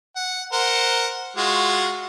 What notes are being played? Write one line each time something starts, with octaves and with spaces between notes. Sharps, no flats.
F#5
A#4 C5 F#5
G#3 F4 F#4